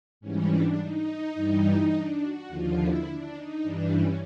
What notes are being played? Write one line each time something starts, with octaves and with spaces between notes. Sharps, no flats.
G#2 E3 G3 C#4
D4
D#4
G2 E3 G3
D4
F#4
D#2 D3 F3 F4
E4
D4
D#4
G2 E3 G3 D4
C#4